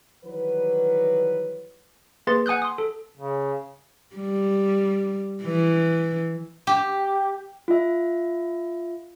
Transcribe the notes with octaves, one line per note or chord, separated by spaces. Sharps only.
D#3 E3 F#3 G3 B4
A#3 G#4 B4 C6 A6
F#5 G#5 D#6 F#6 G6
C6 D#6
A4
C#3
G3
E3
G4
F4 E5